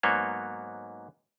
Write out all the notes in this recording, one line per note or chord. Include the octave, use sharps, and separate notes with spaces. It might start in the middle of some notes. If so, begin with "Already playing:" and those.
G#2 F#3 A#3 B3 C#5